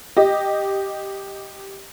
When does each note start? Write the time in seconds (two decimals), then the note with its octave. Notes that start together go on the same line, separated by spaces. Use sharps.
0.17 G4 D#5